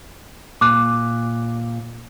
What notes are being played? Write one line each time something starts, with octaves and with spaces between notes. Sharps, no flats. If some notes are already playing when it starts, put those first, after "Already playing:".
A#2 D6 F#6